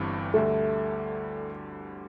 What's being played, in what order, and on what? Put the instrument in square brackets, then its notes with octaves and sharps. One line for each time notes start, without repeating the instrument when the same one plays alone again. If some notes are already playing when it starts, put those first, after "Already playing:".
Already playing: [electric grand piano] G1 G2 E3 G3 C4
[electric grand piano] D2 D3 G3 [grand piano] A3